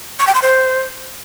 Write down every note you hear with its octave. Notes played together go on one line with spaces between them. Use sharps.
C#6
G5
C6
C5